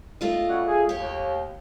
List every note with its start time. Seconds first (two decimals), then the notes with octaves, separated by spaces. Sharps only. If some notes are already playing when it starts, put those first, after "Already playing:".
0.21 A3 F4 D#5
0.48 G3 C#4 F#4
0.65 G#4
0.89 D#2 G4 C#5